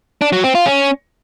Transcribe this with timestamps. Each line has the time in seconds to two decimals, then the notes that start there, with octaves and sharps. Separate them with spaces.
0.21 D4
0.33 F#3
0.44 C4
0.55 F4
0.66 C#4